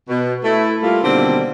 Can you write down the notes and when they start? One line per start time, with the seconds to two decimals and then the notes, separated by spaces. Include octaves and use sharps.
0.09 B2
0.44 A3 E4
0.82 G3 A3 A#3 F4
1.03 B2 D3 D#3 G3 A#3 C4